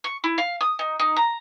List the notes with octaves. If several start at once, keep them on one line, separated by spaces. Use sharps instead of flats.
C#6
E4
F5
D#6
D#4
D#4
A#5